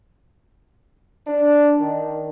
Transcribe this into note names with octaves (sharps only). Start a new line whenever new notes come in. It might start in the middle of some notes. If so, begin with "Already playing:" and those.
D4
D#3